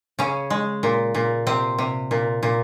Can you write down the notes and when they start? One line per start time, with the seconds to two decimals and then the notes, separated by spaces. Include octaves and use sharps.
0.19 C#3 C#4
0.50 G#3
0.83 A#2
1.15 A#2
1.47 C3 C4
1.78 C3
2.11 A#2
2.43 A#2